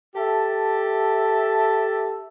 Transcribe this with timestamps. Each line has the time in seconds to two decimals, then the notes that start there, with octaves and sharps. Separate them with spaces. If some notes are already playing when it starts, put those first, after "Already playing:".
0.16 G4 A4 E5 A5